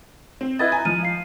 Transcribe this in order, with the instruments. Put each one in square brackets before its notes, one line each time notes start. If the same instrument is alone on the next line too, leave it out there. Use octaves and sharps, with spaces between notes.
[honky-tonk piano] C4
[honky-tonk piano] E4 B4 D#5 [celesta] G#6 A6
[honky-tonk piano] G#5 [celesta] A#5
[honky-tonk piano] F3 F6 [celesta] D#7
[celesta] F5 C7